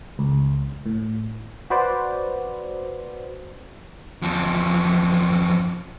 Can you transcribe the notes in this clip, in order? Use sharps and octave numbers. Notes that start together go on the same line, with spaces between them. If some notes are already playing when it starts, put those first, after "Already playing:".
C#2
A2
F#4 B4 C5 D5
E2 F3